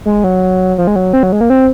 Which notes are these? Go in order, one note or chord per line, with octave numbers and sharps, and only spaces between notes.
G#3
F#3
F3
G#3
F#3
C4
F#3
G#3
A#3
C4